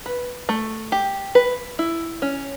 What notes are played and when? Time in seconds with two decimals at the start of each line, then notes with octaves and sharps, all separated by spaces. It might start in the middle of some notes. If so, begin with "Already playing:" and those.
0.06 B4
0.49 A3
0.92 G4
1.35 B4
1.79 E4
2.22 C#4